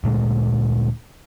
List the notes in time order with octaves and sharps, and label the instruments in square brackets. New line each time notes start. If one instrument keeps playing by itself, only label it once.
[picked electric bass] D2 A#2 G#3